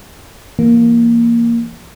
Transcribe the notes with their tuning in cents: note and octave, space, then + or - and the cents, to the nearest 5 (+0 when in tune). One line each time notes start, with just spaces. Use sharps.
E3 +35 A#3 +5